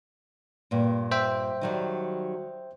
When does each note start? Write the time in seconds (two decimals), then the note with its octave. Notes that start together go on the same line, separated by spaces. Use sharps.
0.71 G2 A#2
1.11 C5 E5 G5
1.61 D#3 F#3 G3